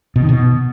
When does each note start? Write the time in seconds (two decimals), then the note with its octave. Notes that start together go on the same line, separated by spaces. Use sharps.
0.16 B2
0.22 D#3
0.29 B2